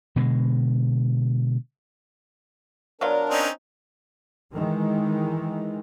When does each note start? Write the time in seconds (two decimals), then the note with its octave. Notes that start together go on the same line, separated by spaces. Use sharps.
0.16 B2 D3 G#3
3.01 F#3 B3 D4 F4 A#4 D5
3.30 C4 C#4 D#4
4.53 D#3 E3 G#3